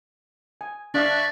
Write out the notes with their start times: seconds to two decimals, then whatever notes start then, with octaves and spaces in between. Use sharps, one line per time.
0.61 G#5
0.94 D4 D5 E5 F5 C#6 F#6